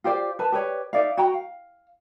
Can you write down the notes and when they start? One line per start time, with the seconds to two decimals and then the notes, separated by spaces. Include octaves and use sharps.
0.04 F4 G4 C5 D5
0.39 B4 A5
0.52 G4 B4 C#5 D5
0.93 D#4 D5 E5 F5
1.17 F#4 G5 A#5
1.34 F5